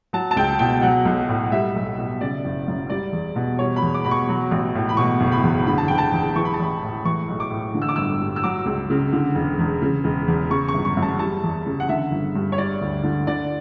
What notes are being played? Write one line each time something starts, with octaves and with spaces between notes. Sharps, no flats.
F#3 A5
A5
C#2 G5
B2 G5
F#3 F#5
B1
A2
G3 E5
B1
B2
C#3 D5
F#1
F#2
G3 D5
E2
B2
G3 C#5
B5
E2
D6
B2 B5
C#6
F#3
A1
A2
B5
B2 C#6
F#1
B5
E2
D3 B5
A5
F#1 G5
A5
E2
E3 C#6
B5
A5
A1 B5
A2
E3 C#6
B1
D6
A2
D3
E6
D6
G1 E6
G2
E6
F#3 D6
C#2
C#3
D3
E1
E2
C#3
E1
E2
C#3 C#6
C#6
G1
C#6
F#2
A5
G3 A5
E2
C#3
F#5
D3 E5
G1
G2
C#5
G3 D5
D2
D3
D3 D5